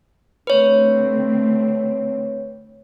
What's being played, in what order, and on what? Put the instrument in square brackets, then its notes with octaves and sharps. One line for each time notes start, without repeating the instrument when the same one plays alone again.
[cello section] D3 A3 C4 [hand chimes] B4 C#5